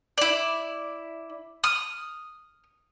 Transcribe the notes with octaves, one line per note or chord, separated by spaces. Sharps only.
E4 D5
D#6 F6